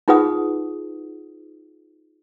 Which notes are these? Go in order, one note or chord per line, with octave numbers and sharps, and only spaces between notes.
D#4 F4 G#4 B4 F#5 D#6